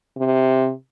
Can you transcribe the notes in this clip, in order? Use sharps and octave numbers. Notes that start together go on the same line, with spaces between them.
C3